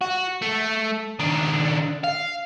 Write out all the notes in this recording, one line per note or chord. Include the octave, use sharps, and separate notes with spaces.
F#4
A3
D#3 D4
F5